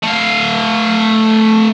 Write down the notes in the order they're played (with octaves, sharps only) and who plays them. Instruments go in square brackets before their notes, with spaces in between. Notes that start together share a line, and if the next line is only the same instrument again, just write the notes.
[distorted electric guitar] A3 F5